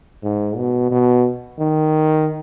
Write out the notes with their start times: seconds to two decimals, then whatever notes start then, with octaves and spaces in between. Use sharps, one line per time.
0.23 G#2
0.57 B2
0.90 B2
1.59 D#3